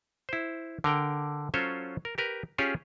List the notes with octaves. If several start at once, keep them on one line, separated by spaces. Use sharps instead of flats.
E4 C5
D3 A#4 G5
F#3 C#4 F4 A4 C5 C#5
A#4
G4 A#4 B4
C#4 F4 G4 G#4 C#5